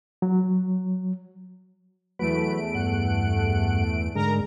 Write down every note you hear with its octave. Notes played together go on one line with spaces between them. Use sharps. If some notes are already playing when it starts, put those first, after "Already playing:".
F#3
E2 F#3 A3 B4 D7
G2 F#5
G#2 D3 G#3 A#4 A#5